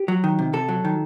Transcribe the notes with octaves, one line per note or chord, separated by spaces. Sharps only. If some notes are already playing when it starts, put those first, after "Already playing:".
Already playing: G4
F#3
D#3
C3
C3 A4
F#3
D#3